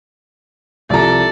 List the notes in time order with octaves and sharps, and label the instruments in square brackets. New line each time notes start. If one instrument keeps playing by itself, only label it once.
[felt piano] C2 F3 A#5 [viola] A4 D5